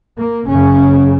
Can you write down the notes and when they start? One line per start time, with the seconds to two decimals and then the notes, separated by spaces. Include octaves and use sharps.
0.17 A#3
0.46 F#1 F#2 C#3 C#4